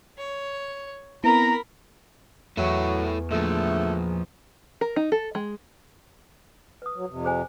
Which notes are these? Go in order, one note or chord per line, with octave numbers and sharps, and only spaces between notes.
C#5
B3 C4 E4 A#4 A#5 B5
E2 F#3 A3 E4 C#6
A#2 D3 F3 A3 G#4
A#4
D#4
A4
G#3
B4 D#6
F#3
F2 C3
G#4 C5 G#5